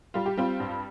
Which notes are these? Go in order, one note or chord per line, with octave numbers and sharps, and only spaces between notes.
G3 F4
G4
G3 C4 F4
G2